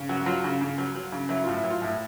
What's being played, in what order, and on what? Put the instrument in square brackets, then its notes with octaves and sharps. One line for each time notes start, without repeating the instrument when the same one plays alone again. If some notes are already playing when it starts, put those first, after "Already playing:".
Already playing: [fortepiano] C#3
F#3 F#4
F#4
F#3 F4
C#3
C#3
F#3
F#3
C#3
F#3 E4
A2 F4
E4
F#3
F4
A2 E4